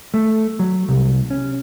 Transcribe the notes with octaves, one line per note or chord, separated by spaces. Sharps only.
A3
F#3
C2
C#4